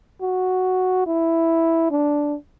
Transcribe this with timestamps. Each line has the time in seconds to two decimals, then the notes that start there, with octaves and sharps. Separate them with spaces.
0.22 F#4
1.06 E4
1.91 D4